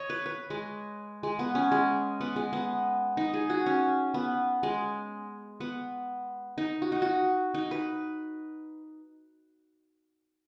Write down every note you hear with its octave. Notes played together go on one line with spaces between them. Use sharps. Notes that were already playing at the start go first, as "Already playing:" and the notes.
Already playing: C#5 D#5
B4
B4
G#3
G#3
B3
C#4
G#3
B3
G#3
B3
D#4
G#4
F#4
C#4
B3
G#3
B3
D#4
F#4
D#4
F#4
D#4
B4